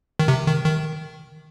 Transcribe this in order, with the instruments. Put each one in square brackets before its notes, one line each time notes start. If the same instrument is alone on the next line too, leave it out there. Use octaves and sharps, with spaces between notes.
[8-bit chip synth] D#3
C3
D#3
D#3